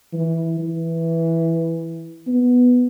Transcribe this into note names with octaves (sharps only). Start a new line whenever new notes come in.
E3
E3
B3